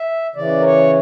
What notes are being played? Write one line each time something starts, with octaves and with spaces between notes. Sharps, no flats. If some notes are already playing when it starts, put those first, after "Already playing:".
Already playing: E5
C#3 E3 D5
A#4
C#5